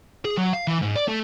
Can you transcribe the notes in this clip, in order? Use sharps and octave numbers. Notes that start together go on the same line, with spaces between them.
G#4
F#3
F5
E3
G#2
D5
A3